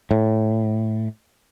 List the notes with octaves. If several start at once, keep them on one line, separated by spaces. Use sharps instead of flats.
A2